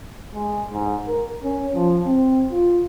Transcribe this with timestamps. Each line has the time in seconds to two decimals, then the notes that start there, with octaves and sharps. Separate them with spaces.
0.34 G#3
0.72 G#2
1.07 A#4
1.43 C#4
1.75 F3
2.06 C4
2.51 F4